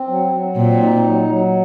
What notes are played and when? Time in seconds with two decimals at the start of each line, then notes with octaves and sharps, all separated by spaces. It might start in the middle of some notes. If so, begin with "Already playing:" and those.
Already playing: C4
0.08 F#3
0.32 F#3
0.55 A#2 C4
0.80 D#4
1.04 F#3
1.27 F#3